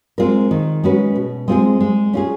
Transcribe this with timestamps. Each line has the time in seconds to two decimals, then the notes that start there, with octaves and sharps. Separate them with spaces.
0.18 G#3 C4 F4 A#4
0.51 D#3
0.84 G#3 C#4 F#4 B4
1.16 B2
1.48 G#3 C4 F4 G#4
1.80 G#3
2.13 C#4 F4 G#4